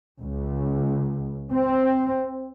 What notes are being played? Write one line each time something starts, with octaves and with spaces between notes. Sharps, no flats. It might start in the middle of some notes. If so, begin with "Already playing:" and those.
C#2
C4